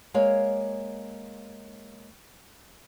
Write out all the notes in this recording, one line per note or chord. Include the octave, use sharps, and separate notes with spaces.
G#3 A#3 C#5 F5